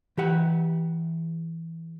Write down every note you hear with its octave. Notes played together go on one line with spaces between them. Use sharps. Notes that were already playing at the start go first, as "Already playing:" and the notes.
E3 G4 F#5